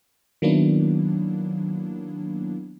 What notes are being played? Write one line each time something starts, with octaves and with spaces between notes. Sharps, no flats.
D#3 F#3 A#3 B3 D4 E4